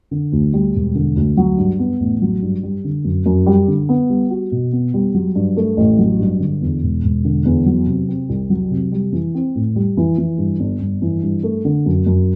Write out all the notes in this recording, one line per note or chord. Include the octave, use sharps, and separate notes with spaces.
D3
D2
G3
E1
D3
D2
F#3
G2
B3
A1
F#3
G2
G3
D3
F#2
F#2
G3
D3
B3
G3
F#4
B2
B3
G3
F#3
G2
A3
A1
F#3
G2
D3
E2
E1
E1
D3
E2
F#3
C3
C4
C2
F#3
C3
G3
E3
C4
A2
G3
E3
E3
G2
G1
G1
E3
G2
A3
D3
F#2
F#2